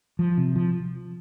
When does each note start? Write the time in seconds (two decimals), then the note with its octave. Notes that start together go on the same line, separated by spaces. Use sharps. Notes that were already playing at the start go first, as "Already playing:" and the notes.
0.19 F3
0.38 C3
0.56 F3